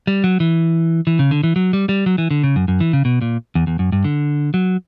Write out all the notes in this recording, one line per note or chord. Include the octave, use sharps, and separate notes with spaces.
G3
F#3
E3
E3
C#3
D3
E3
F#3
G3
G3
F#3
E3
D3
C#3
F#2
F#2
E3
C#3
B2
A#2
E2
E2
F#2
G2
D3
F#3